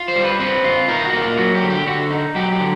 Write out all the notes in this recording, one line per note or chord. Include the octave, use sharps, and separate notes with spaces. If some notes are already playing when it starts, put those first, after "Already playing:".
Already playing: F4
C5
G3
B4
C4 B4
F4
D#4 A#4
F#4
A#3
F4
F#3 F#4
G4
D3
G4
D3 F#4
D#4
F#3 G4
G4
D3